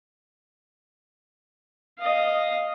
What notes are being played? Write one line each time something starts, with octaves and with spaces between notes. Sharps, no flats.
D#5 F5